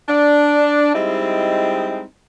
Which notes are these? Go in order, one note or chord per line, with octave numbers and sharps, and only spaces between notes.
D4
G3 G#3 C4 D#4 E4